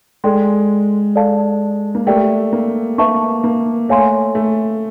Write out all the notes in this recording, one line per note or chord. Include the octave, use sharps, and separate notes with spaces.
G#3 A4 D5 G5 C6
A4 D5 F5 A5
A#3
A3 G4 A#4 D5 G5
A#3
A#3 B4 E5 A5 C#6
A#3
A3 C#5 F5 G#5 C6
A3